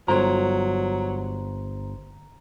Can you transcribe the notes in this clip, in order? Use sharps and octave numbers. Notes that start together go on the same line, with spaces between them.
G1 F#3 C5 A#5 C6